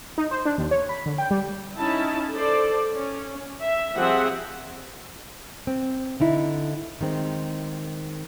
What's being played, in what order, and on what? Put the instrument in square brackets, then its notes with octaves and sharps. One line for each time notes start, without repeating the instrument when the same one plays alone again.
[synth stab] D#4
C5
D4
D#2
C#5
B5
D3
G5
G3
[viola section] C#4 D#4 E4 A5
A4 C5 D5
C#4
E5
F3 G3 C4 G#4 E5 F#5
[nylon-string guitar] C4
D3 D#4 E4
D#3 G#3 C4